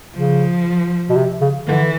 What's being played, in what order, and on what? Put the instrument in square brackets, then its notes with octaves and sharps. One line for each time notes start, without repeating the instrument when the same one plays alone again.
[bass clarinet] C#3 [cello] F3
[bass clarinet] B2
C3
C#3
[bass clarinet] D3 [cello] E3